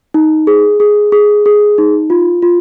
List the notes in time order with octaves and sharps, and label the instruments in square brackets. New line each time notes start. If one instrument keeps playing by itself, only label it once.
[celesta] D#4
G#4
G#4
G#4
G#4
D#4
F4
F4